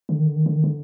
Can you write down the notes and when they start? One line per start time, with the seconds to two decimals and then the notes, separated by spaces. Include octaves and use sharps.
0.09 D3
0.19 D#3
0.27 D3
0.36 D#3
0.46 D3
0.55 D#3
0.64 D3